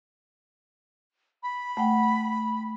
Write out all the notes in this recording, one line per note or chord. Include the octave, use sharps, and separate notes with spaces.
B5
A3 F#5 G5